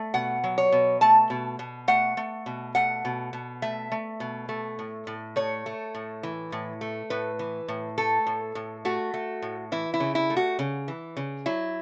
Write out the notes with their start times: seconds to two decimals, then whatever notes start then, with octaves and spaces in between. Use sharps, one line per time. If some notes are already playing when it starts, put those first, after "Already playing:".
Already playing: A3
0.14 B2 F#5
0.44 F#3
0.58 C#5
0.72 B2
1.01 A3 A5
1.30 B2
1.59 B2
1.88 A3 F#5
2.17 A3
2.46 B2
2.75 A3 F#5
3.05 B2
3.33 B2
3.62 A3 E5
3.92 A3
4.20 B2
4.49 A3
4.79 A2
5.07 A2
5.36 A3 C#5
5.66 A3
5.95 A2
6.23 E3
6.52 A2
6.81 A3
7.10 A2 B4
7.39 E3
7.68 A2
7.98 A3 A4
8.27 A2
8.55 A2
8.85 A3 F#4
9.14 A3
9.42 A2
9.72 E3 E4
9.94 E4
10.00 C#3
10.15 E4
10.30 A3
10.37 F#4
10.59 C#3
10.88 E3
11.17 C#3
11.46 F#3 E4